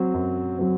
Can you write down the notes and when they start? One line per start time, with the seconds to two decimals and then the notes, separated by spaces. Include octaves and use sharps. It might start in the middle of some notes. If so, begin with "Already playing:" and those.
Already playing: F#3 C4
0.14 F#2
0.59 F#3 C4